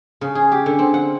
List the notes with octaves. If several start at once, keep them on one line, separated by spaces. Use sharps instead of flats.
C#3
G#4
G4
D3
C4
F#5